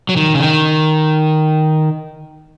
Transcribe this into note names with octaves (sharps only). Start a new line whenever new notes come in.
F#3
D#3
C#3
D#3